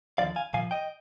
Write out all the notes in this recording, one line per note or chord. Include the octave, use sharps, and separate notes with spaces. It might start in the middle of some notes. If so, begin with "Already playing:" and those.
D#2 D3 F3 D5 F5
F5 G#5
C2 A#2 F3 F5 G#5
D#5 G5